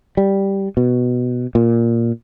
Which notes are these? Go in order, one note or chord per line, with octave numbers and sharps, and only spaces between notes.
G3
B2
A#2